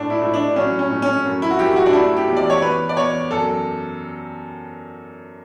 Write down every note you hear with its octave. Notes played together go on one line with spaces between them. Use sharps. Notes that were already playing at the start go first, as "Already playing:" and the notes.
Already playing: A2 D4
E4
A2
D4
F#3 C#4
C#4
A2
C#4
F#2
E4
F#4
F#2 G4
F#4
D4
A3 E4
G4
E2
D5
C#5
E2 B4
D5
E2 C#5
F#2 A4